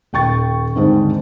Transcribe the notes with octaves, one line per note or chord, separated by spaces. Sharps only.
D#1 G5 C#6 A6
D#2 G#2 D3 G#3 C4 D4